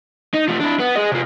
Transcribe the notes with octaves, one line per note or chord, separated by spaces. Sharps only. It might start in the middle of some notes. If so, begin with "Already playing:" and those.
D#4
F3 A3
D4 E4
B3
G#4 D#5
C3 F4